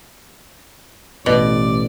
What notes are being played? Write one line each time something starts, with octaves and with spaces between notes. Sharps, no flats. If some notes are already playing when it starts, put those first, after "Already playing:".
A1 B2 D5